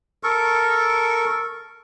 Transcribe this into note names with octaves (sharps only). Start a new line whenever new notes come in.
A4 A#4 C#6